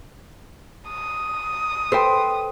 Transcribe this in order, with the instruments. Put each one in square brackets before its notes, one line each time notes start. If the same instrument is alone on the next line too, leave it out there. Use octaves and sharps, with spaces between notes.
[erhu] D#6
[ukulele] A4 B4 G5 [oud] C5